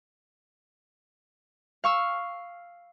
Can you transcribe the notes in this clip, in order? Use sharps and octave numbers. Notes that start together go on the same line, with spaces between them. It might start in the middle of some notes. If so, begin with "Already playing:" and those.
F5 C#6 E6